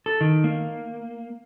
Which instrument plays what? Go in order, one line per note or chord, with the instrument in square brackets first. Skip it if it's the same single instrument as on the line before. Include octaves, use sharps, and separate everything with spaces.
[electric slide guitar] A4
D#3
A#3